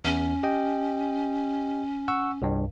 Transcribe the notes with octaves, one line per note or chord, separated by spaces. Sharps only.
E2 C#4
G4 D#5 G5
F#5 C#6 E6
C2 G2